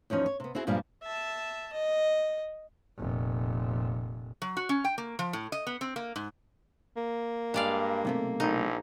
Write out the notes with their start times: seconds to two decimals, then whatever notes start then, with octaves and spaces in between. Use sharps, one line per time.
0.10 E2 F3 C#4 D#4
0.26 C#5
0.40 C3 B3
0.55 C4 E4 F#4 G#4
0.67 G2 A#2 F3 G3 G#3
1.03 E5 A5
1.73 D#5
2.98 F1 A#2
4.42 F#3
4.57 F#4
4.69 C#4
4.84 G5
4.98 A#3
5.19 F3
5.33 A2
5.52 D#5
5.67 B3
5.81 C4
5.96 A#3
6.16 G#2
6.97 A#3
7.54 G2 G#3 D5 F5
8.05 B1 C3 A3
8.40 A#1 D#4